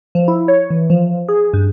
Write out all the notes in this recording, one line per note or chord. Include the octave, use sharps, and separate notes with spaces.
F3
E4
C#5
E3
F3
G#4
G2